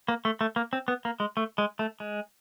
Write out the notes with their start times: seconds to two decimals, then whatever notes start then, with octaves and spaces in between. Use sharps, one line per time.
0.08 A#3
0.25 A3
0.41 A3
0.56 A#3
0.73 C4
0.88 B3
1.05 A#3
1.20 G#3
1.37 A3
1.58 G#3
1.79 A3
2.00 G#3